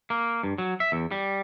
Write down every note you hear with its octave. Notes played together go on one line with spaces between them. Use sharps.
A#3
G2
F#3
E5
E2
G3